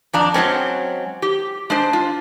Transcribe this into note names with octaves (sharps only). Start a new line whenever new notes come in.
F2 D4 A#5
F#3 G#3 C4 C#4
G4
G#3 D4 C5
F4